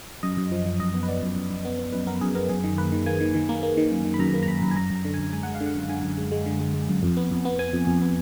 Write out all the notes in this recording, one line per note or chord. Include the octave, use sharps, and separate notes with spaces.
F#2 D#5
F#2
F3
F3
F#2 D#5
B3
B4
B3 D5
F#2
F#2
F#2
B3
B3
F#2 B4
B3 A#4
F#2 G#4
B3 A#4
F#2 G#4
D#3
A#3 B4
D#3
A#3 G#5
D#3
D#3
A#3
A#3
D#3
F#2
D#3
B5
F#2 A#5
A#3
A#5
F#2 B5
F#2
G#5
F#2 A#5
F#2
A#5
D3
F#2 G#5
G#3 G#5
G#3 F#5
F5
D3
F#5
F#2
D3 G#5
F#2
G#3
G#3
D3
G#3
G#3
F#2
F2
B3
F2
B3
B3 G#5
F2
F2
B3